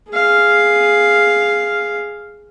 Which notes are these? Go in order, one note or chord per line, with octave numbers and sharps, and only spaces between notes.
G#4 F5